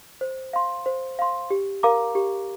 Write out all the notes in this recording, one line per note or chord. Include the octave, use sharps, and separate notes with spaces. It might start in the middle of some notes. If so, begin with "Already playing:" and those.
C5
F5 C6
C5
F5 C6
G4
A#4 F5 A#5 D6
G4